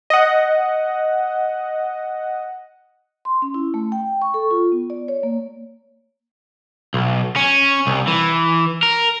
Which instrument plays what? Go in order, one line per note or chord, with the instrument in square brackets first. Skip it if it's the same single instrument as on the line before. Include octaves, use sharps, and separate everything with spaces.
[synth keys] D#5 F#5
[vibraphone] C6
C#4
E4
A3
G5
C#6
A4
F4
B3
D5
C#5
A#3
[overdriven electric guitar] B1
C#4
C2
E3
A#4